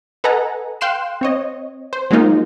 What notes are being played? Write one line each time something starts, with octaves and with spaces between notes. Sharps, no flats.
A4 B4 D#5 F#5 G#5 A#5
F5 G5 C6 F#6 C7 E7
C4 C#5 D#5
C5
F#3 G#3 A#3 D#4 F4